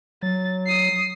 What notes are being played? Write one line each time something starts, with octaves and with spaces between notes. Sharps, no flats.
F#3 A6
D#6 C7